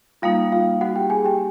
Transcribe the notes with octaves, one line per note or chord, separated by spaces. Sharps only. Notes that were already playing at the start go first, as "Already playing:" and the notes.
G3 A#3 D#4 F4 F5
F4 F5
F#4 F#5
G4 G5
G#4 G#5
G4 G5